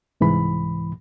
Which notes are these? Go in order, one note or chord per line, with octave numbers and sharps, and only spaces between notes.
C2 G#2 E3 B5